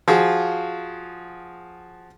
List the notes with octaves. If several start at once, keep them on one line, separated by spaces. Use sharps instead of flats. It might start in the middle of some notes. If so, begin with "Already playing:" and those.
F3 F4 F#4 G#4